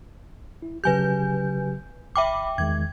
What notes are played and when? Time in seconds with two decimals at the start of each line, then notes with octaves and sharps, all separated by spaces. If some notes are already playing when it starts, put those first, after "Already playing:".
0.62 E4
0.84 C#3 F#3 G4 B4 G#5 G6
2.16 G1 E5 G5 B5 D6
2.58 E2 D#3 G#3 G#6